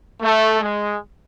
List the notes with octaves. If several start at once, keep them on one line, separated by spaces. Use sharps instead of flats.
A3
G#3